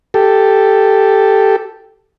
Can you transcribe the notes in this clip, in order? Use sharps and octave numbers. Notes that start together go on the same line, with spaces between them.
G4 A4